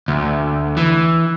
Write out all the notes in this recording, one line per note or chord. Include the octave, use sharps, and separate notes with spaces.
D2
E3